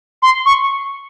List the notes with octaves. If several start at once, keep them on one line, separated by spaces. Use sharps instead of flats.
C6
C#6